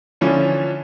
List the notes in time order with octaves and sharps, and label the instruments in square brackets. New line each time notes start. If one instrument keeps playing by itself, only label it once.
[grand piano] D3 E3 F3 C#4